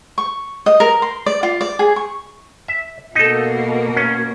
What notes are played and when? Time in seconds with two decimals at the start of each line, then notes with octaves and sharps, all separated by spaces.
0.18 C#6
0.66 D#5
0.80 A#4
1.02 C6
1.26 D5
1.43 F4
1.61 D5
1.79 G#4
1.96 C#6
2.68 E5
3.15 B2 A#3 D#4 A4
3.96 C#4